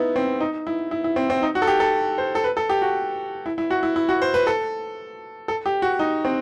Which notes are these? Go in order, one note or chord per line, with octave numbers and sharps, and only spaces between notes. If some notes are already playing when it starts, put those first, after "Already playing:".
Already playing: B3 D#4 E4
C4
D#4
E4
E4
E4
C4
C4
D#4
F#4
A4
G4
A4
C5
A4
B4
A4
G4
F#4
E4
E4
F#4
E4
E4
F#4
C5
B4
A4
A4
G4
F#4
D#4
C4